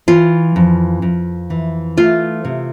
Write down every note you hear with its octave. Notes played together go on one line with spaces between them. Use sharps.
E3 F4
F2
F2
E3
A3 F4
C3